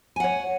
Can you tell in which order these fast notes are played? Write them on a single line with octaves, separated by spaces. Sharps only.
G#5 F#5 C#5